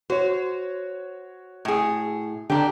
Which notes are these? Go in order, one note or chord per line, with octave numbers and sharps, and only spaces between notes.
F#4 C5 C#5
A2 G#4
D3 D4 G4 A#5